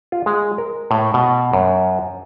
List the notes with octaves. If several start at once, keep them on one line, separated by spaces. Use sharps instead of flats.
F4
G#3
A#4
A2
B2
F#2